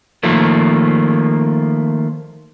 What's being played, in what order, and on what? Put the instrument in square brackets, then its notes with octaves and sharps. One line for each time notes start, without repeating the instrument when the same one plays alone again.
[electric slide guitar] D#3 F3 A3 A#3